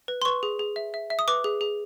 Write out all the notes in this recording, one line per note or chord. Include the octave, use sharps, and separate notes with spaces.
B4
C6
B4 C#6
G#4
G#4
E5
E5
E5
D#6
B4 D6
G#4
G#4